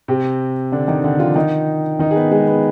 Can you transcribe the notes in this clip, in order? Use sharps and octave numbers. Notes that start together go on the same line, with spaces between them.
C3 C4
D3 D4
D#3 D#4
D3 D4
F3 F4
D#3 D#4
D#3 D#4
G#4
B3 B4
G#3 G#4
B3 B4